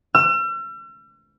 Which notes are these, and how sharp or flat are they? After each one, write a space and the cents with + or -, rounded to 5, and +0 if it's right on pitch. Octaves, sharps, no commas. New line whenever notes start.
E6 +45